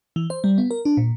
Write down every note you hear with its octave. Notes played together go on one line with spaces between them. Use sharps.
E3
C5
G3
B3
A#4
D4
A#2